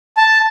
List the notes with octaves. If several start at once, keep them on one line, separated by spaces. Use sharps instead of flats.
A5